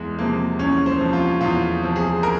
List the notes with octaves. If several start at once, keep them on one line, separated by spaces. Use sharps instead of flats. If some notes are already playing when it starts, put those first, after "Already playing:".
Already playing: E2 G#3
C3 F3 A#3
E2 C#4
C5
C3 F3
F4
E2 F4
C3 F3
G#4
A#4